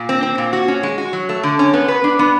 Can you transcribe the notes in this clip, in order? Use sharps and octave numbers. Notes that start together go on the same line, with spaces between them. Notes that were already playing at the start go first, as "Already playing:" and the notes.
Already playing: A#2
C4
C4
A#2
F#4
C#4
G#3
F#4
F#3
A3
D3
C#4
B3
B4
D4
B3